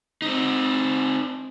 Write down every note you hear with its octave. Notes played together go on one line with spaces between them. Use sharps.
C4 D#4